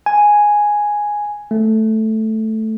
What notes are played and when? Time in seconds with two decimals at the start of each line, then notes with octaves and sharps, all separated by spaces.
0.06 G#5
1.51 A3